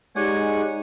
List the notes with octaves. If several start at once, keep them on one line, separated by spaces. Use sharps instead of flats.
G#3 D#4 G4 C#5 D5 F#5 G#5 D6